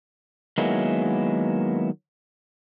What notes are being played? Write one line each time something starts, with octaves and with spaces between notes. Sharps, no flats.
D#3 F#3 G#3 A#3 B3 E4